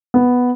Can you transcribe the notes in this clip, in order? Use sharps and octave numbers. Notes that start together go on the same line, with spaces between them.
B3